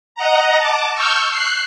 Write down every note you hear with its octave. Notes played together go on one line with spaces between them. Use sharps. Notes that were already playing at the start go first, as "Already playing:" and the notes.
D#5 F#5 A#5
A5 D6
C#6 E6 F6 G6
F#6 C7